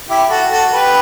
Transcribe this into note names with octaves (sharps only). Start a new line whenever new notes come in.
E4 G4
F#4 A4
F#4 A4
G4 B4